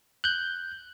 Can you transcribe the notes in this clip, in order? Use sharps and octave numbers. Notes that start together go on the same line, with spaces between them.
F#6 G6